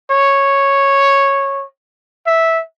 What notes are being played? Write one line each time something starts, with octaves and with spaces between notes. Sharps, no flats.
C#5
E5